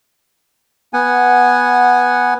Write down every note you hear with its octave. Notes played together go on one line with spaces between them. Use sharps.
B3 F#5 G#5